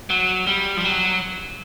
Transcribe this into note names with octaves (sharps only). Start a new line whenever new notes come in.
F#3
G3
F3
F#3